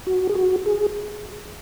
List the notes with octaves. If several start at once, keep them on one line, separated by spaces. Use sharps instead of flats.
F#4
G#4
F#4
G#4